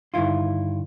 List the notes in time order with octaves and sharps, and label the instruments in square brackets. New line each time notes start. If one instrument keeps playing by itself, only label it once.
[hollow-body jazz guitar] G2 D3 D#3 E4 F4